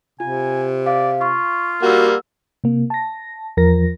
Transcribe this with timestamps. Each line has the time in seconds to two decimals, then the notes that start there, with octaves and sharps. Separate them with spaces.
0.20 C3 F4 G#5
0.86 D5 F5
1.21 F4 C#6
1.82 G3 A#3 F#4 F#5 E6
2.64 C3 A#3
2.90 A5 A#6
3.57 E2 F3 A#4 A#6